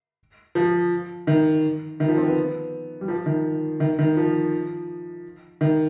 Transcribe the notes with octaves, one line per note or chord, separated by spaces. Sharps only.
F3
D#3
D#3
F3
C4
B3
G3
F3
D#3
D#3
D#3
F3
D#3